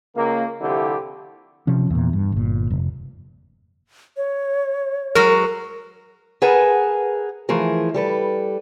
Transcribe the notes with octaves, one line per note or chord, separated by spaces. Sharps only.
C#2 A#3
C2 D3 F3 E4 G4
C3 F3 C#4
E2 A#2
G2
G1 A#2
F1
C#5
F#3 G#3 F#4 A#4
G#4 A#4 B4 F#5 G#5 A5
E3 F3 A3 G#4 A#4
G3 A4 B4